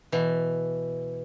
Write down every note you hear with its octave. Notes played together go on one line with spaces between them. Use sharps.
B2 E3